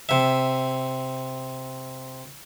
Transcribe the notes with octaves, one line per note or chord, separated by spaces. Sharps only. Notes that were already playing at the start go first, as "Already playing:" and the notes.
C3 E5